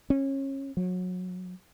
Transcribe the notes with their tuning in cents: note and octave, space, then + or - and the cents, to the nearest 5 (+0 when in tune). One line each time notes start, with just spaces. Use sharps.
C#4 -25
F#3 -25